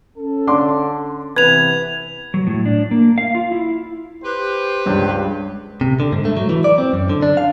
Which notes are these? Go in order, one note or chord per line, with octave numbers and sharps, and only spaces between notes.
C#4 A4
D3 C6 D6
C3 E3 B3 B4 G#6 F7
F#3
A2
D4
A#3
F5
F4
E4
G4 B4 C5
C#2 G2
C3
D3
G#2
A3
F#3
E3
D5
C4
F#2
D3
D4
F5